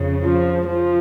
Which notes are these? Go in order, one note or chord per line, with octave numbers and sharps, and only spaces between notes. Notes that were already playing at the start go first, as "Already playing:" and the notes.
Already playing: F2 C#3
F3
F3